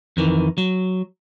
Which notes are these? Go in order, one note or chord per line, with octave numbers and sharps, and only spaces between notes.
F2 D#3 E3
F#3